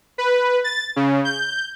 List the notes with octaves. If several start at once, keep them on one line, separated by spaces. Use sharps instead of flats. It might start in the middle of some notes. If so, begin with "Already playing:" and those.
B4
A6
C#3
G6